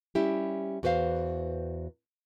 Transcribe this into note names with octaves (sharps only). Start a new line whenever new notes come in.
G3 C#4 E4 G4
E2 F#4 B4 C5 F5